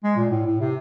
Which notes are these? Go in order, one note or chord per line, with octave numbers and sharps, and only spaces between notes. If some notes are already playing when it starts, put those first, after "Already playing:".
G#3
A#2
A2
A2
C3